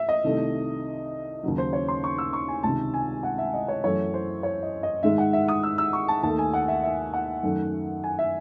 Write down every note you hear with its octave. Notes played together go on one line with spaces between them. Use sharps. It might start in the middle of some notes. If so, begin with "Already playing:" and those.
Already playing: E5
D#5
C2 C3 D#3 A3
D#2 C#3 F#3
C5
C#5
C6
C#6
E6
C#6
G#5
C#2 C3 D#3 A5
G#5
F#5
E5
D#5
C#5
F#2 E3 A3 C#5
C5
C#5
D#5
D#5
G#2 D#3 G#3 E5
F#5
E5
D#6
E6
E6
C#6
A5
D#2 D#3 A3 A5
G#5
F#5
E5
E5
F#5
F#2 D#3 A3
G#5
E5